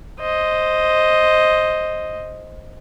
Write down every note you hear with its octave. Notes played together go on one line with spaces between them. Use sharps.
C5 D#5